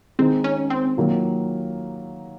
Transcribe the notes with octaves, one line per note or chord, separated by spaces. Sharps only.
D#3 G#3 C4 D#4 G#4
C#4
C4
D#3 F#3 A#3 F4